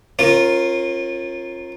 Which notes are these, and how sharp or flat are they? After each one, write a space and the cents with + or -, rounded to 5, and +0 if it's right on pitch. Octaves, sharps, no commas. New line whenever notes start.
C#4 -40 F4 +0 A#4 +0